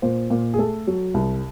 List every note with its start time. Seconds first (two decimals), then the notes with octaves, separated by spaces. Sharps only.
0.02 A#2 C5
0.30 A#2
0.54 G#4
0.58 A3 A4
0.87 F#3
1.14 C2